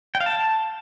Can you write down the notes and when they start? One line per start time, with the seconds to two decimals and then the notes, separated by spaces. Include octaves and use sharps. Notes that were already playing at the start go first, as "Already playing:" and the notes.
0.15 G5
0.20 F5
0.26 A5